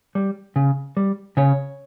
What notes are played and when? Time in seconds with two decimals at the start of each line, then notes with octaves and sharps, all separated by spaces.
0.15 G3
0.56 C#3
0.97 G3
1.37 C#3 C#5